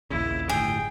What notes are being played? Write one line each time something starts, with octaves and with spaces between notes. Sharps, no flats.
A#1 D#2 C#3 E4
D1 G1 A2 G#4 G5